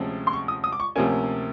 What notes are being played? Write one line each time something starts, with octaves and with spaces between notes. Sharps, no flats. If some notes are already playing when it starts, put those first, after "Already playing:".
Already playing: D2 C3 F3 G#3 C#4
C6
C#6
D#6
D#6
D6
C#6
D2 C3 F3 A#3 C#4 G#5